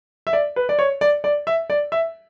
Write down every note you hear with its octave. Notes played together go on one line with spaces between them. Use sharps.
E5
D5
B4
D5
C#5
D5
D5
E5
D5
E5